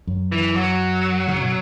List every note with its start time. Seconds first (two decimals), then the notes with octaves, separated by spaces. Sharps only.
0.07 F#2
0.32 E3
0.56 F#3
1.28 C#3
1.41 B2